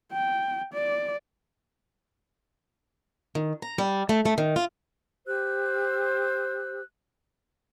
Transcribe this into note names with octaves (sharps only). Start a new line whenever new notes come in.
G5
D5
D#3
A#5
G3
A3
A3
D#3
F4
G4 C5 E6 F#6